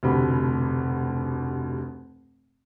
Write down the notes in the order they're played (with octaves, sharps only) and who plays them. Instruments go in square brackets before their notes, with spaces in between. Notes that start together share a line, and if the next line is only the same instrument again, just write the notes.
[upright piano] F1 D2 B2 G4 B5